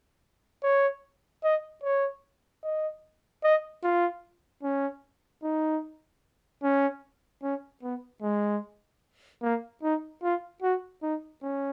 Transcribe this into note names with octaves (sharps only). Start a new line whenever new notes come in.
C#5
D#5
C#5
D#5
D#5
F4
C#4
D#4
C#4
C#4
B3
G#3
A#3
D#4
F4
F#4
D#4
C#4